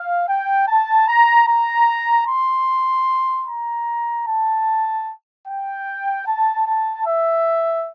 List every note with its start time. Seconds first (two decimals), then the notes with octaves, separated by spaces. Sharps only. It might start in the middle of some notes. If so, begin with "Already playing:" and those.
Already playing: F5
0.28 G5
0.67 A5
1.08 A#5
1.47 A#5
2.27 C6
3.47 A#5
4.27 A5
5.47 G5
6.27 A5
6.67 A5
7.06 E5